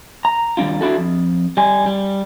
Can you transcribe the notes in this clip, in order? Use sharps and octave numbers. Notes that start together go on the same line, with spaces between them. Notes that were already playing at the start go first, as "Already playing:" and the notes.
A#5
D#2 G3 D4 F4
D4 E4 F#4 A4
F2
G3 G#5
G3